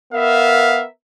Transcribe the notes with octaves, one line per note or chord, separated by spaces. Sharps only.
B3 A#4 E5 F5